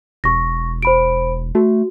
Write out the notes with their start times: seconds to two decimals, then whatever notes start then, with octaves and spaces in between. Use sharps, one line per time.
0.24 E1 C#6 A#6
0.82 C5 B5 D7
1.55 A3 F#4